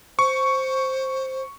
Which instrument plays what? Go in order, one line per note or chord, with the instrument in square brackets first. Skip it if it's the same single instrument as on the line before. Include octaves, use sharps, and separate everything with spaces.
[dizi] C5 [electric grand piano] C#6